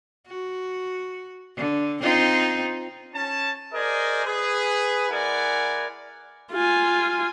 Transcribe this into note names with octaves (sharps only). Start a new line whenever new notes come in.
F#4
D3
C4 D#4 F4
C#4 A5
G#4 A#4 C5 D5 D#5 G#5
G#4 B4
G#3 E4 A#4 D5 F#5 G#5
F4 G#5